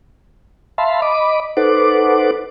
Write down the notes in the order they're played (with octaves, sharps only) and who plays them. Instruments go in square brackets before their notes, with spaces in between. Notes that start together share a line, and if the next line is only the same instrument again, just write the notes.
[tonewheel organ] E5 F5 A5 B5 C6
D#5 B5 D6
D#4 A4 B4 C5 F#5 D6